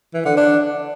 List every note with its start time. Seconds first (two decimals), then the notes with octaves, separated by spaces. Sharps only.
0.14 E3
0.26 D3
0.37 D4